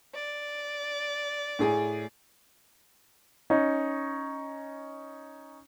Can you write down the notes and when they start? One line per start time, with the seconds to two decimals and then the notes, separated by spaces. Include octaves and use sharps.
0.14 D5
1.59 A2 G#4 G#5
3.50 C#4 D#4